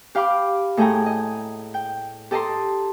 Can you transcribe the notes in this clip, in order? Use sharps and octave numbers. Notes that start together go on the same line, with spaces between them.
G4 F5 G5 B5 D6
A2 A3 G#4 G5 G#5 A#5
D#5
G5
G4 A4 D#5 A5 A#5 C6